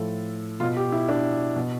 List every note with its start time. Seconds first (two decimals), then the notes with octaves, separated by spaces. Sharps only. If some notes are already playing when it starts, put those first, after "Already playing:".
Already playing: A2 F3 A4
0.60 B2 F4
0.77 G4
0.92 E4
1.08 D4
1.56 B2